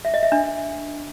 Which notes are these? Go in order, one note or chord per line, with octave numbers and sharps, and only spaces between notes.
E5
D#5
E5
D4